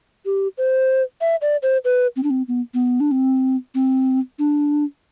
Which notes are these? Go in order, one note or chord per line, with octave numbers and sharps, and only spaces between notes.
G4
C5
E5
D5
C5
B4
C4
D4
C4
B3
B3
D4
C4
C4
D4